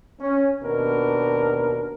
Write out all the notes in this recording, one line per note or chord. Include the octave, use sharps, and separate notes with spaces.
C#4
D#2 B2 D4 A#4